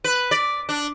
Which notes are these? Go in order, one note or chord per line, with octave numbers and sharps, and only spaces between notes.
B4
D5
D4